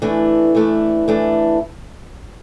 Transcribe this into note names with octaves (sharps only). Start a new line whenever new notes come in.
E3 A3 D4
E3 A3 D4
E3 A3 D4